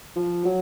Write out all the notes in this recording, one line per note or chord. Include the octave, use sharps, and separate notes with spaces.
F3
F#3